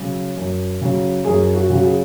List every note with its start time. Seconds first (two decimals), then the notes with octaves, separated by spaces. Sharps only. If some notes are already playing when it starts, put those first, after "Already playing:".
Already playing: C#3 F#3
0.37 F#2
0.81 C#3 F#3
1.25 F#2 G#4
1.55 F#4
1.69 C#3 F#3 F#4
1.84 G#4